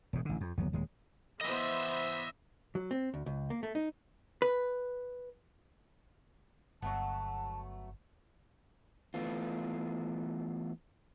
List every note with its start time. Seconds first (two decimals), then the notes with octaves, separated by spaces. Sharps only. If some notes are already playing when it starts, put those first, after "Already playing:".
0.13 E1 G#2
0.25 A1 D3
0.41 F2
0.58 G1 D#2 F#3 B3
0.73 D#1 D#2 G#3
1.41 E3 B3 C5 D#5 E5
2.75 F#3
2.91 C4
3.14 D2
3.26 C#2
3.50 A#3
3.63 A3
3.75 D#4
4.42 B4
6.82 G1 F#3 A3 B3 A5
9.14 E3 A3 B3 F4